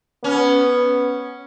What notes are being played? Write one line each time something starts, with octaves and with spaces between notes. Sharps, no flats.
B3 C#4